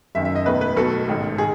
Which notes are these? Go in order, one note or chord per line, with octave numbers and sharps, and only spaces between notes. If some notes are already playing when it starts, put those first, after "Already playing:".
F#1 F#2 D#3 E5
E5
D#5
E1 E2 D#3 A3 B4
B4
B1 B2 A3 A4
A1 G#2 D#3
D#3 G#4